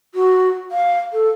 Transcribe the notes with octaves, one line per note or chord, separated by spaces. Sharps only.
F#4
F5
A4